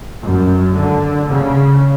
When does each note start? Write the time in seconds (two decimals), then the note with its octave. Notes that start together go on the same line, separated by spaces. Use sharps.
0.22 F#2
0.75 D3
1.29 C#3